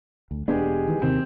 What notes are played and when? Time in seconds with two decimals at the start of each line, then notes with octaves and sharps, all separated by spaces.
0.31 D2
0.48 E1 G#3 B3 D4 G4 G#4
0.87 D#3 E3
1.02 D#2 C3 D#3 C4